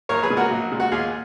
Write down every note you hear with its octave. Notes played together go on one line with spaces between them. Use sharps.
A#1 A#4 C#5
G#4 B4
A#2 G#3
F#4 A#4
A#1
A#2 G#3
F#4
D#2 F4 G#4